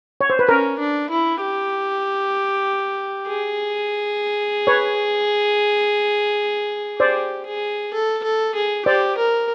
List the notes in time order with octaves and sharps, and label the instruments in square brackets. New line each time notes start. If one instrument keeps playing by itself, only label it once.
[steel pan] C#5
C5
B4
[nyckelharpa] C#4 [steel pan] A#4
[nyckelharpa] D4
E4
G4
G#4
[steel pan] B4 C#5
[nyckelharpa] G4 [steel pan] C5 D5
[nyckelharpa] G#4
A4
A4
G#4
[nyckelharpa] G4 [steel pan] C5 D5
[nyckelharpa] A#4